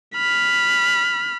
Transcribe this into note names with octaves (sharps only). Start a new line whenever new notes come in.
B5 F6